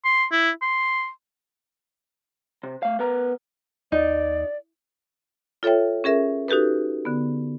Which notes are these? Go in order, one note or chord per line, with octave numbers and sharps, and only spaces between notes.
C6
E4
C6
C3
A3 F5
B3 A#4 B4 A#5
D#2 D#4 D5
F4 A4 C#5 E5 G5
C#4 G#4 A#4 E5
D#4 F#4 G4 A4 B4
D3 B3